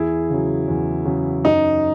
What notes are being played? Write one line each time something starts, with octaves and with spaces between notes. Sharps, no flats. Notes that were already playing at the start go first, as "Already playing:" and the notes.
Already playing: E2 E4 G#4
C#3 F#3
E2
C#3 F#3
F#2 D#4